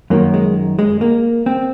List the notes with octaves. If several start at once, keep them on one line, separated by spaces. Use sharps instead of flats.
F#2 D#3 A#3
G#3
G#3
A#3
C4